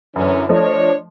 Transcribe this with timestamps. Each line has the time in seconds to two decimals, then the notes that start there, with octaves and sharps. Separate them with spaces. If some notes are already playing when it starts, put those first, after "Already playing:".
0.16 F#2 D3 E3 C#4
0.49 F3 A3 D4 C#5 D#5